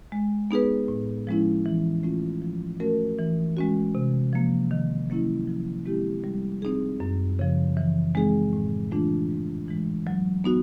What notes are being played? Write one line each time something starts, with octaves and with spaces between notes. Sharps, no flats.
G#3
B3 D#4 G#4 B4
A2
F3 G#3 C#4 E4
E3
A3 C#4 F4
F3
A3 C#4 F#4 A#4
E3
G#3 C#4 F#4
C3
F3 A#3
D#3
F#3 A#3 C#4 E4
F3
G#3 C4 E4 G4
G3
C4 D#4 G#4
F#2
C#3 F3
E3
G#3 C4 D#4 G#4
A2
E3 A3 D4 F4
G#2
E3 G#3
F#3
B3 D#4 F#4